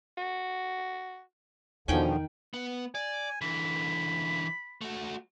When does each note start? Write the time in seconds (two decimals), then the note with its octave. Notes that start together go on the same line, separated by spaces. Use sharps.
0.18 F#4
1.88 E2 B2 D3 D#3 F3 C#4 G5 G#5
2.54 B3
2.95 D5 G#5
3.42 D3 E3 B5
4.81 A3 F#4